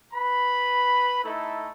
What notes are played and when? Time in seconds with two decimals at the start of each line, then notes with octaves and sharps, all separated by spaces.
0.13 B4 B5
1.23 A3 D#4 E4 A4